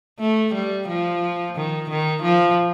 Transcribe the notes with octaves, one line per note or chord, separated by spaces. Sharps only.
A3
G3
F3
D#3
D#3
F3